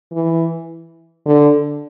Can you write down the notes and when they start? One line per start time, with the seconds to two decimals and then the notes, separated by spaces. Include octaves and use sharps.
0.12 E3
1.26 D3